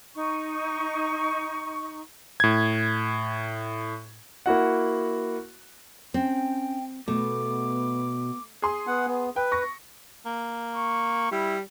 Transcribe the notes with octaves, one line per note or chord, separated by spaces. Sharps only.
D#4 C#6
A2 G#6
A#3 E4 F#4 F#5
C4 C#4 G5
B2 A3 B3 D6
G#4 C6 D#6
B3 F#5
B3
B4 G5
C#6 A#6
A#3
C#6
G3 E4